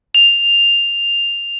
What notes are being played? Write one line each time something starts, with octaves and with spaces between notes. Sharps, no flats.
F7